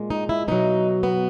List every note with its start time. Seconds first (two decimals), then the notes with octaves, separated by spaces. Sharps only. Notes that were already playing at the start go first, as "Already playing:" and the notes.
Already playing: A#2 G#3
0.10 D#4
0.29 E4
0.48 B2 F#3 D#4
1.03 B3